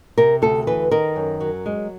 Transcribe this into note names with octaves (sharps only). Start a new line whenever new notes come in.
C3 A#4
D2 A4
E3 B4
D#3 A#4
F#2
F#3
G#3